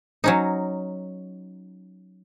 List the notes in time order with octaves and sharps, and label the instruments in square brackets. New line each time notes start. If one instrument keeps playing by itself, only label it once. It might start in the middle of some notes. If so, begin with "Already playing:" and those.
[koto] F#3 C#4 D#4